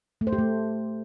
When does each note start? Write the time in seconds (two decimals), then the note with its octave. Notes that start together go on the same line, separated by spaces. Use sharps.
0.21 A3
0.27 C5
0.33 G4
0.38 A3